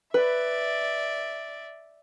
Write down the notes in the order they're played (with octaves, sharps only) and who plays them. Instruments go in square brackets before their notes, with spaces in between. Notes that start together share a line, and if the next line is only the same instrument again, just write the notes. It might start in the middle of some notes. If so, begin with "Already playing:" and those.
[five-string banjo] B4 [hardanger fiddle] D5 E5